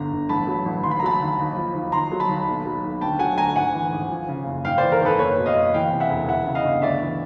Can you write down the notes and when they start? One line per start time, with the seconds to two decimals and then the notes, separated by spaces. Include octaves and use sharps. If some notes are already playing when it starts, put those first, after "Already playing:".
Already playing: G1 D3 A#5
0.12 G1
0.29 A1 A5 B5
0.47 F#3
0.66 A1
0.83 D#2 C6
0.91 B5
0.99 A#5
1.02 F#3 A5 B5
1.21 D#2
1.39 D#2
1.57 F3
1.75 D#2
1.92 D#2 A#5 C6
2.12 F#3
2.20 A5 B5
2.29 D#2
2.47 B1
2.65 F#3
2.84 B1
3.01 D2 G5 A5
3.19 F#3 F#5 G#5
3.38 D2 G#5 A#5
3.56 G#1 F#5 G#5
3.74 E3
3.92 G#1
4.10 F3
4.29 C#3
4.46 F#1
4.64 G#1 F5 G5
4.78 E3 C5 D5
4.92 A#4
5.01 G#1 A4 B4
5.19 F#1 B4 C#5
5.38 B2
5.46 D#5 F5
5.56 F#1
5.74 E3 F5 G5
5.90 C3 F5
6.00 E5 F#5
6.10 E1
6.27 E3 E5 F#5
6.46 C#3
6.55 D#5 F5
6.65 G1
6.82 D2 D5 E5
7.00 E3